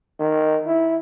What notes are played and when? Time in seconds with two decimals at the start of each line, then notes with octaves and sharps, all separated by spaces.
0.19 D#3
0.66 E4